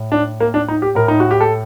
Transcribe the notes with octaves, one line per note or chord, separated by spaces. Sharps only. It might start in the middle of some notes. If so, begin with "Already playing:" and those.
Already playing: A2
D4
A#3
D4
D#4
G4
A2 A#4
D#4
F#4
G4
A4